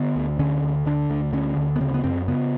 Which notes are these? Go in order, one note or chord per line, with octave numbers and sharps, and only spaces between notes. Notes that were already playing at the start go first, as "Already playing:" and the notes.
Already playing: D3 B3
D2
D3 C#4
D2
D3 D4
D2
D3 C#4
D2
B3
C#3 C4
B3
F#2 C4
C#3 B3